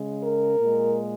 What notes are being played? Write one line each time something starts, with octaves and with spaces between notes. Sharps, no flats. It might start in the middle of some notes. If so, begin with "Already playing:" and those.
Already playing: C#3 G#3
A#4
A#2
G#3